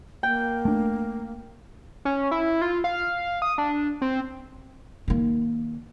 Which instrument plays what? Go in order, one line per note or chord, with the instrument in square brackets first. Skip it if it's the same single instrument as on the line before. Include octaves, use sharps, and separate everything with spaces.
[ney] A#3 [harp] G5
[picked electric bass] A3 D4
[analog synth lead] C#4
E4
F4
F5
D#6
D4
C4
[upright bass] D#3 A#3